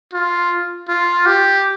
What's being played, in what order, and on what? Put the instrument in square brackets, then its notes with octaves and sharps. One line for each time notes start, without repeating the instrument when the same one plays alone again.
[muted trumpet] F4
F4
G4